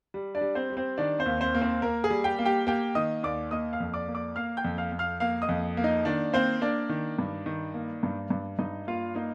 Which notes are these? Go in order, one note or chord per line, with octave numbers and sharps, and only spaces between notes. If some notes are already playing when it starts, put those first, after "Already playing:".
G3
D4 D5
G3
C4 C5
G3
C4 C5
D#3 D4 D5
C4 C5
D#2
C4 C5
A#3
C4 C5
A#3 A#4
G#4
G3
G4 G5
A#3
G4 G5
A#3 G4 G5
D#3 D#5 D#6
D#2 D5 D6
A#3 D#5 D#6
F5 F6
F2
D5 D6
A#3
D5 D6
A#3 F5 F6
G5 G6
F2
F5 F6
F2
F5 F6
A#3 F5 F6
D#5 D#6
F2
A#3
D#4 D#5
D#3 D4 D5
A#3 C4 C5
A#3 D4 D5
D#3
G2
D#3
A#3
G2
G2
G2 D#4 D#5
A#3 F4 F5
A#3 D#4 D#5